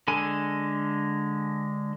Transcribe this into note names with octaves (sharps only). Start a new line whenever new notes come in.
D3 G#3 A4 G#5